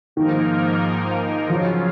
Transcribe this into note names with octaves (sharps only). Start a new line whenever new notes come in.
G#2 D#3 F3 A#3 D#4 A#4
C#3 F3 F#3 C#4 F4